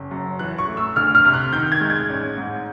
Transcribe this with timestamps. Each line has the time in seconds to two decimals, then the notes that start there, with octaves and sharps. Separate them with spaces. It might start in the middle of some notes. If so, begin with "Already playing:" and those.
Already playing: F#1
0.11 F#2
0.39 E3 F#6
0.58 C#6
0.68 A3
0.77 E6
0.96 D2 F6
1.15 F6
1.25 C3
1.34 F#6
1.53 D#3 G6
1.72 G#6
1.81 G#3
1.90 G#6
2.09 A1
2.37 G#2